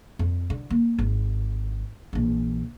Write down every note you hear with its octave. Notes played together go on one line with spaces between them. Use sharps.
F2
D3
A#3
G#1
A#1 E3